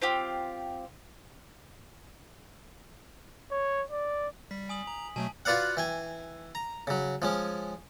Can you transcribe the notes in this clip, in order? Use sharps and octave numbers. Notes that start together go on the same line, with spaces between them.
C4 F4 G4
C#5
D5
G3 B6
G#5 D#6 F#7
A#5
B2 F#3 A3 G#5 A5
F4 F#4 B4 D5 F5 F#5
E3 G5 G#5
A#5
C#3 F#3
F3 G#3 C#4